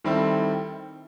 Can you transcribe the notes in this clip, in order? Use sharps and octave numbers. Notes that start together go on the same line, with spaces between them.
D#3 G3 C4 E4 A4